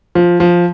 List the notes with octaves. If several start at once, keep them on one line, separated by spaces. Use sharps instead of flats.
F3
F3